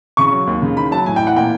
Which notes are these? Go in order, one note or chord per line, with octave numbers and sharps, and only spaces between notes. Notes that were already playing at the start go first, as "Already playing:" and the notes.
C#3 C#6
F#3
D#2
C#3
D#3 B5
F#3 A5
A2 G#5
E3 G5
F#5
A#2 G5